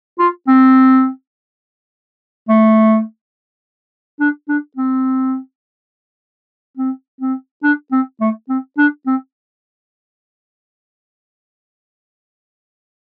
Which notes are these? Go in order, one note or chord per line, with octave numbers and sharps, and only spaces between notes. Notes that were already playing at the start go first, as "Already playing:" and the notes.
F4
C4
A3
D4
D4
C4
C4
C4
D4
C4
A3
C4
D4
C4